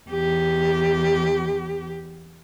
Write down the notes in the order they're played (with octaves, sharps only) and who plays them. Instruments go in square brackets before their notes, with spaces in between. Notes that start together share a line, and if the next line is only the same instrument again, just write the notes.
[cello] E2 G4